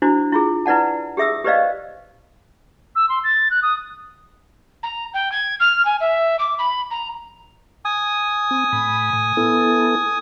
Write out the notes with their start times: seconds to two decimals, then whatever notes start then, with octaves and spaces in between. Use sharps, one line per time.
0.02 D4 E4 F#4 C5
0.32 E4 F4 G#4
0.66 E4 B4 D5 F#5 A5
1.17 G4 G#4 E5 D#6 E6
1.44 G4 B4 C5 D5 D#5 F5
2.96 E6
3.09 C6
3.24 A6
3.51 F#6
3.62 D#6
4.83 A#5
5.14 G5
5.31 G#6
5.60 F6
5.85 G#5
6.00 E5
6.39 D6
6.58 B5
6.90 A#5
7.85 G#5 D#6
8.51 C4
8.73 A2 B5
9.13 A2
9.37 B3 E4 A4